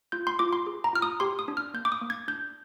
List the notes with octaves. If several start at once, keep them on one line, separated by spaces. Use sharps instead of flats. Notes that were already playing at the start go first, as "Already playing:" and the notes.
F4 G6
C6
F4 D6
C6
G#4
A#5
F4 F6
D#6
G4 C6
D#6
D4
F6
A#3 G6
D6
D#6
A#3
G#6
D4 G6